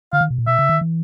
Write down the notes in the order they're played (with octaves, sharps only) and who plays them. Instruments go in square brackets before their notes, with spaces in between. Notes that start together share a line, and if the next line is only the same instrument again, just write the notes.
[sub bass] D3 [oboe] F5
[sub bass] D#3
B2
A#2
[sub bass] B2 [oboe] E5
[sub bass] C#3
D#3
E3